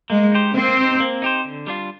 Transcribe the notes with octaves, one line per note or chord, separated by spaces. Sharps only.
G#3 A#3
D#4 G4 C5
A#3 C4
D#4 G4 C5
A#3
D#4 G4 C5
D3
G3 D4 F4